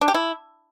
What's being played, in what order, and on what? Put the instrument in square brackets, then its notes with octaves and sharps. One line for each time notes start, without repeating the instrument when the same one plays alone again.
[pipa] D4
G4
E4